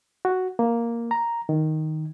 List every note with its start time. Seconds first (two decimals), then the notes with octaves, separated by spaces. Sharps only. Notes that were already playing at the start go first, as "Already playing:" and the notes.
0.25 F#4
0.59 A#3
1.11 A#5
1.49 D#3